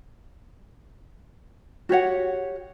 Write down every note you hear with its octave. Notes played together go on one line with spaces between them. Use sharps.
F#4 G4 C#5 F#5